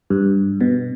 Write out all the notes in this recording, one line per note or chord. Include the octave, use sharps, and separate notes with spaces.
G2
B2